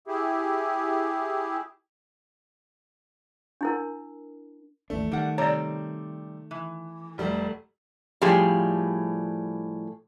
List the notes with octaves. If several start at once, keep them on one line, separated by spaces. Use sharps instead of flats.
E4 G4 G#4
D4 E4 A#4
A1 D#2 A3 D4
D#3 G3 F#5
C3 G3 C#5 D5 A#5
E3
F1 G3 A3
A2 F3 G3 G4 G#4